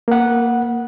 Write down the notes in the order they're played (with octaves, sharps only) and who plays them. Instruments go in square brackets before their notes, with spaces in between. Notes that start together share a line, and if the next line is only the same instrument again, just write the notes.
[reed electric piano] A#3 F#5